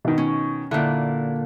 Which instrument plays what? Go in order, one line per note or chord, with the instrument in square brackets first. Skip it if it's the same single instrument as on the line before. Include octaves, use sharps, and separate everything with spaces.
[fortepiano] B2 D#3
[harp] C#4
[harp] A#2 D3 [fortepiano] E4